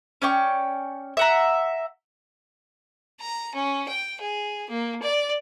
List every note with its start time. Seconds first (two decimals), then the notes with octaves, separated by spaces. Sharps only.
0.22 C#4 D5 G5 C#6
1.17 E5 F#5 A#5
3.20 A#5
3.55 C#4
3.88 G5
4.20 G#4
4.69 A#3
5.02 D5